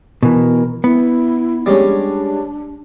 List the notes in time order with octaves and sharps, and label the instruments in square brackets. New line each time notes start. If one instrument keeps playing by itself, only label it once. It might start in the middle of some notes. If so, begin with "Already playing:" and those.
[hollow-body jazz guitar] B2 E3 [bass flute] A#4
[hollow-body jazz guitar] B3 [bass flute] E4
[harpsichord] G3 G#3 C#4 [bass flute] D4